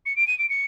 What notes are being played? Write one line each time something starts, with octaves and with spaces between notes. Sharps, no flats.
C#7
D7
D#7
D7
C#7